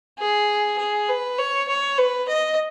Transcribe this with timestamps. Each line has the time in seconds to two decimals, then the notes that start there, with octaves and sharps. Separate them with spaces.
0.19 G#4
0.79 G#4
1.09 B4
1.38 C#5
1.68 C#5
1.98 B4
2.28 D#5